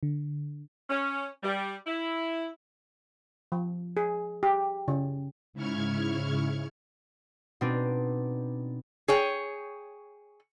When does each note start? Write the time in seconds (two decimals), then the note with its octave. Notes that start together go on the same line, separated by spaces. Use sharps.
0.03 D3
0.89 C#4
1.43 G3
1.86 E4
3.52 F3
3.97 G#4
4.43 G4
4.88 C#3
5.53 G#2 C#3 E4 C#6 F6 G#6
7.61 B2 C4 D4 D#4
9.08 G#4 C#5 G5